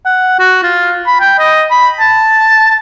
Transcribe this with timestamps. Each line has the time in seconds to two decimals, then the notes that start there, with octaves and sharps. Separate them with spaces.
0.06 F#5
0.39 F#4
0.63 F4
1.07 B5
1.20 G5
1.39 D#5
1.71 B5
2.00 A5